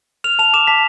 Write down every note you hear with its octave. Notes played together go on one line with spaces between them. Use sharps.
F6 F7
A5 F7
D6 E7
A5 B6